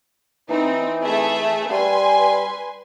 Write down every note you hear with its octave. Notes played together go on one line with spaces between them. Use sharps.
E3 C4 D#4
A3 G#4 E5
G3 B4 G#5 C6